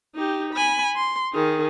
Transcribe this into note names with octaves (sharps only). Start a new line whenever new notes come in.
D#4 G4
G#5 B5
C6
D#3 G#4